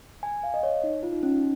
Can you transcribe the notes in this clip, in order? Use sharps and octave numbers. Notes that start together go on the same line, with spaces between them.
G#5
F5
D#5
C#5
D#4
F4
D#4
C#4
D#4